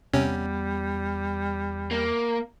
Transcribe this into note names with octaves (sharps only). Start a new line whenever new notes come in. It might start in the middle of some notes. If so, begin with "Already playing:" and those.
E2 C3 G3 B3 C#4
A#3